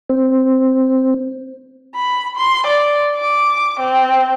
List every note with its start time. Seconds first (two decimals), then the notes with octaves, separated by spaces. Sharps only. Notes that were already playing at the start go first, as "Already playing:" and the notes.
0.10 C4
1.96 B5
2.36 C6
2.66 D5
3.16 D6
3.80 C4